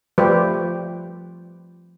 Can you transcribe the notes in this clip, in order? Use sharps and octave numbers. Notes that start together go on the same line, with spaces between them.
F3 G3 A3 G4 B4 C5